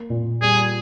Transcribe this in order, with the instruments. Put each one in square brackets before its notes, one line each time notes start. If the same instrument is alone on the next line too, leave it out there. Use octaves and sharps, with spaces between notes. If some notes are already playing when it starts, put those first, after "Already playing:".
Already playing: [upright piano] A#3
A#2
[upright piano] G3 [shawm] G#4